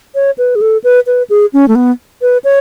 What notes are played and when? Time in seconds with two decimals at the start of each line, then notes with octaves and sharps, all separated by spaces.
0.15 C#5
0.38 B4
0.55 G#4
0.61 A4
0.84 B4
1.07 B4
1.30 G#4
1.53 C#4
1.68 A3
1.75 B3
2.22 B4
2.44 C#5